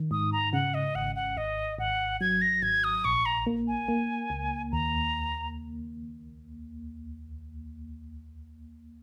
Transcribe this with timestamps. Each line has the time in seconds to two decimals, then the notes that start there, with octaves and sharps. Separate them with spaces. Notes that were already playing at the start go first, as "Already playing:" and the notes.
Already playing: D#3
0.11 G#2 D#6
0.33 A#5
0.53 C#3 F#5
0.74 D#5
0.95 G#1 F#5
1.15 F#5
1.37 G#1 D#5
1.78 G#1 F#5
2.21 F#3 G#6
2.42 A#6
2.62 G#1 G#6
2.84 D#6
3.05 A#1 C#6
3.26 A#5
3.46 A#3
3.68 G#5
3.88 A#3
4.30 C#2
4.72 D#2 A#5